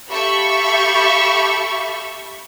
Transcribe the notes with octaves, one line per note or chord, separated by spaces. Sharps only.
G4 A4 E5 F5 B5 C#6